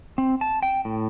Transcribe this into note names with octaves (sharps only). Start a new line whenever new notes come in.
C4
A5
G5
A2